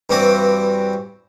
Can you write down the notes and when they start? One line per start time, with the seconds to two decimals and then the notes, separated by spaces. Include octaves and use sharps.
0.10 G2 E3 C4 F#4 D6